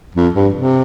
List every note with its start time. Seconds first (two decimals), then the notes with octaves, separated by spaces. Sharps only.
0.15 F2
0.35 G2
0.54 C3